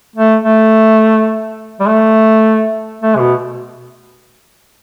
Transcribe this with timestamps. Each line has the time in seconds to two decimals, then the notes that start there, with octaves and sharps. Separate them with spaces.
0.16 A3
0.44 A3
1.80 G3
1.87 A3
3.02 A3
3.15 C3
3.20 B2